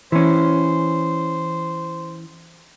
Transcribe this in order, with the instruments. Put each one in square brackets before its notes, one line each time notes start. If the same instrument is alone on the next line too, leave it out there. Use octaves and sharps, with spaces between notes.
[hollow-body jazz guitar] E3 C#4 [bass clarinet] C5